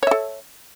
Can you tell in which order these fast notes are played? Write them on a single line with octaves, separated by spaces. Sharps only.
C#5 E5 A4